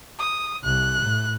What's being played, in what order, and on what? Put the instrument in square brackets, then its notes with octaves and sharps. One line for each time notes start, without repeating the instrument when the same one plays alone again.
[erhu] D#6
[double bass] C2 [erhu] F#6
[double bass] A2